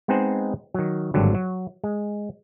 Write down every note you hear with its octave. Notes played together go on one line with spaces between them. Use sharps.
G#3 B3 C4 D#4 G#4 C5
D#3 F#3
G#1 G2 D3 F#3
F#3
G#3